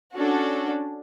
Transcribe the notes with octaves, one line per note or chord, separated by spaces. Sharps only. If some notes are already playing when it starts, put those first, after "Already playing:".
C#4 D4 F#4 A4